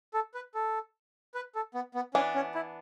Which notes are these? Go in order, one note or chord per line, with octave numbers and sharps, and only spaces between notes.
A4
B4
A4
B4
A4
B3
B3
E3 B3 C#4 D4
C#4
E4